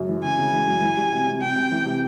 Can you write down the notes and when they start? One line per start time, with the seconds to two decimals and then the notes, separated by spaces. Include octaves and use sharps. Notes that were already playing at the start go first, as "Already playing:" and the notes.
Already playing: F#2 C#3
0.09 E3
0.24 C#3 G#5
0.39 C#3
0.53 E3
0.67 F#2
0.82 E3
0.97 G3
1.13 C3
1.27 C3
1.41 C3 G5
1.56 C3
1.72 E3
1.86 C3